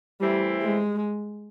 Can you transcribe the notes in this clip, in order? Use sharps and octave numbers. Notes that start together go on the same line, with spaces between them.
E3 G3 A3 C4 E4
G#3